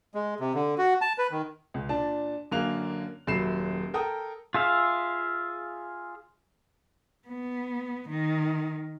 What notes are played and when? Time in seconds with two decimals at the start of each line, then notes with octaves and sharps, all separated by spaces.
0.15 G#3
0.40 C3
0.55 D3
0.78 F#4
1.01 A5
1.18 B4
1.31 D#3
1.74 C#2
1.89 A#2 D4 A5
2.52 F#2 D3 A#3 G#4 F#6 F7
3.27 D#1 F#2 B5 C7 E7
3.94 A4 A#4 G5 D#6
4.55 F4 G#4 E5 F5
7.28 B3
8.09 D#3